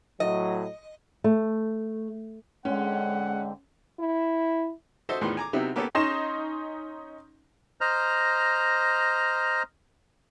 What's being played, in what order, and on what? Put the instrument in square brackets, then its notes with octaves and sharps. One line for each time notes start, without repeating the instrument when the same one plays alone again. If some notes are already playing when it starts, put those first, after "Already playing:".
[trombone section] A2 F#3 [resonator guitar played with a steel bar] D#5
[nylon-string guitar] A3
[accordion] G#2 D3 C4 [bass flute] G#3 [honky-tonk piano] C#4 [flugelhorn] F#5
[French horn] E4
[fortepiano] F#4 A4 C5 D#5 E5
E2 A2 D#3 F4 B4 C6
G#5 A#5 D6
C3 F#3 B3 C4 D#4 E4
A#3 B3 C#4 G4 A4
[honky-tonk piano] C#4 D#4 C6 A#6 E7
[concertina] C5 D#5 A#5 F6